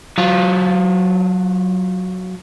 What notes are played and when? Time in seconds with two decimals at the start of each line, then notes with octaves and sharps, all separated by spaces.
0.18 F#3 F4